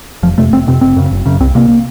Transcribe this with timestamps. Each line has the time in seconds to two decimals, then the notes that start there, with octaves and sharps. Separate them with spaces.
0.23 F1 F3
0.38 F2 C3 A3
0.52 F1 C4
0.67 F2 C3 C4
0.81 F#1 C4
0.96 F#2 C#3
1.11 F#1
1.26 F#2 C#3
1.40 C2 C4
1.55 C3 A#3